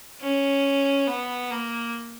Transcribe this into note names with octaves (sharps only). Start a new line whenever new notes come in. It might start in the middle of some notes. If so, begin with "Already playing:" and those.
C#4
B3
A#3